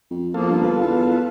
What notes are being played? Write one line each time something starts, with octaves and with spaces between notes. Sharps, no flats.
F2
E2 F3 A#3 F4 A4
G2
G1 B4
E2